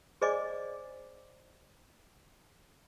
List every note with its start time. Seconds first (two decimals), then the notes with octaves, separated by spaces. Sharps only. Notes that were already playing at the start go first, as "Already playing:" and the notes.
0.22 G#4 C5 D5 D#5 G#5 D6